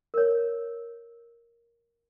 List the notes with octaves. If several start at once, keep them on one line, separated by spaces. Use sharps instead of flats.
A#4 C#5